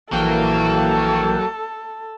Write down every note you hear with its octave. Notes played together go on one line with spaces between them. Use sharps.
A#1 E3 F#3 A#3 A4 G5